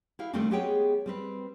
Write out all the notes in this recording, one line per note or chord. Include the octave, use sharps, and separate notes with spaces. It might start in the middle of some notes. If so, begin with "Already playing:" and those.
E4 G4 E5 F5
D#3 G3 A3 A#3 C4 D4
G#3 B3 G4 G#4 C#5 G5
G3 C4 B4